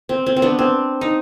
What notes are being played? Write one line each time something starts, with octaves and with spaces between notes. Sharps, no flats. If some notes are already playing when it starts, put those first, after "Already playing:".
C4
C4
C4
B3 D4
C4
D#4